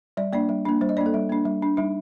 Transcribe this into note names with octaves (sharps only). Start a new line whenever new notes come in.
G3 D5
A#3 D4 D5
G3
A#3 D4
G3 C5
D#5
A#3 D4 D5
A4
G3
A#3 D4
G3
D4
G3 D#4